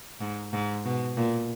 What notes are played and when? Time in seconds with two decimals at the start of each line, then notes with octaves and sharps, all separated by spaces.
0.21 G#2
0.53 G#2
0.85 B2
1.17 A#2